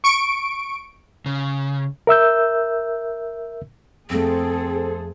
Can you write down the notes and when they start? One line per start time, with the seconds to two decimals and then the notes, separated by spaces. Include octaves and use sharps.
0.04 C#6 D7
1.26 C#3
2.07 A#4 E5 E6 G6
4.10 F2 A3 C4 G#4 A4 C5